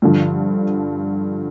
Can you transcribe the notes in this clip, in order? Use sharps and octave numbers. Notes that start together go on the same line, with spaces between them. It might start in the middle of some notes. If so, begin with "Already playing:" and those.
G2 D3 F3